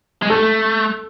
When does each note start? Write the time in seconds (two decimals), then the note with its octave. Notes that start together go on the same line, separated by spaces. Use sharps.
0.22 G#3
0.30 A3 A4